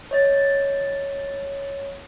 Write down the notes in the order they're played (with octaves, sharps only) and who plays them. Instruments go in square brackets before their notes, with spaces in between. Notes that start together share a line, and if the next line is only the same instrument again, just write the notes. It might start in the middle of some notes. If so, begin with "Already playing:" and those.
[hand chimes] C#5 D#5 A6